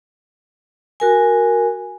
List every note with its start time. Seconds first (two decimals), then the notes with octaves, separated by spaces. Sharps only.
1.00 F#4 A#4 G#5